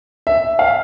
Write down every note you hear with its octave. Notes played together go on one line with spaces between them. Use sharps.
E5
F5